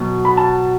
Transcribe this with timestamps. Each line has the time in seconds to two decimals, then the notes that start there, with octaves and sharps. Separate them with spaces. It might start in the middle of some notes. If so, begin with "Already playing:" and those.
Already playing: B2 F#3
0.25 B5
0.37 A5